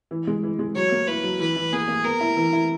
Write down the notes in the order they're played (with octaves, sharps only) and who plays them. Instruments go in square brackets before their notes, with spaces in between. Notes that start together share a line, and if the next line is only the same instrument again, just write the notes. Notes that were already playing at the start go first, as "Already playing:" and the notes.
[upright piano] E3
G#3
E3
G#3
[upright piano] F#3 [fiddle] C#5
[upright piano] A#3
[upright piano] E4 [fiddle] B4
[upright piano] F#3
[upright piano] E3 [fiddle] B4
[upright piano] E3
[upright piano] A#3 [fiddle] G#4
[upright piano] A#3
[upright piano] B3 [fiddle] A#4
[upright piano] E4
E3
E4